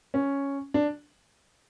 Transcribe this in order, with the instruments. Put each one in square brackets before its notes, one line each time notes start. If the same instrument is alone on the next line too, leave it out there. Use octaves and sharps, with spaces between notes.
[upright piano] C#4
D4